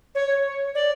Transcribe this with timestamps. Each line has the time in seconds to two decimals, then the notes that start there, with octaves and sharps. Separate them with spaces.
0.15 C#5
0.75 D5